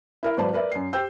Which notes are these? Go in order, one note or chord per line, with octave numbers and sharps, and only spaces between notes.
E4 A#4 E5
G#1 F#3 B4 C5 D5 A5
A#4 B4 D5 E5
F#2 C7
G4 C5 G5 E6 G6